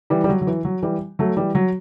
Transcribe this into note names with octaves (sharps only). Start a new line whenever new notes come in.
E3 G3
G3
F#3
F#3
E3
F#3
E3 G3
F#3 A3
E3 G3
F#3